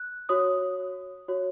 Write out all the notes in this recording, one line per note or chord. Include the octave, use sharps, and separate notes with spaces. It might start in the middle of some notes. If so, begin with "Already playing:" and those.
Already playing: F#6
F#4 C#5 D#6
F#4 C#5